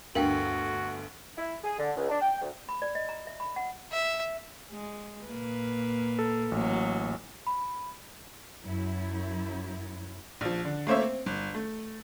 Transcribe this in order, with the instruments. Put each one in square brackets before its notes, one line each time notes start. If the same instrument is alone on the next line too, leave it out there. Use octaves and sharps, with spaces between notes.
[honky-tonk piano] G1 D2 [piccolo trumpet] F#4 [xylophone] A#4 F5 G5
[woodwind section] E4
G#4
D3
C#2
D4
G5
D2
[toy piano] B5
D5
D#5
A#5
E5
B5
F#5
[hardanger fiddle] E5
[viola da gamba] G#3
A#2 A#3 B4
[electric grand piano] A4
[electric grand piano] A1 [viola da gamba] F#3 A#3
[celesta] B5
[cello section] F#2 F#3 E4
[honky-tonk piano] A#1 F3
D3
A3 A#3 C5 C#5 E5
C4
G1
A3